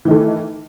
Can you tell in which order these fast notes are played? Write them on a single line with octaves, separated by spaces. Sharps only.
E3 D#3 A3